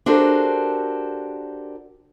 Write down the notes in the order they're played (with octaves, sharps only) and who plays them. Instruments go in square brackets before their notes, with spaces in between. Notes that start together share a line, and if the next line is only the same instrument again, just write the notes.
[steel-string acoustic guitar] D4 F#4 G4 A4 A#4 C5